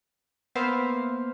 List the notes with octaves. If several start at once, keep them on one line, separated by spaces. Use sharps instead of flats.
A#3 B3 C5 E5 F5